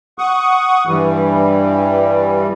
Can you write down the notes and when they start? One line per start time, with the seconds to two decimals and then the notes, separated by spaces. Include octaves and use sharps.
0.19 F#5 C#6 D#6
0.87 G2 E3 G3